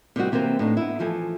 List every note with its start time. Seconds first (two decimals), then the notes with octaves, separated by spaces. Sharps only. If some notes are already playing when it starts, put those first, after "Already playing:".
0.16 C3 D#3 G3 F#4
0.32 C3 E3 A#3 C4 C5
0.59 A2 D4 D#4
0.77 B3 E4
1.00 E3 F3 A4 G#5